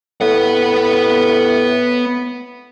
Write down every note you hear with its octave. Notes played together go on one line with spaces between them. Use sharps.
A2 B3 F#5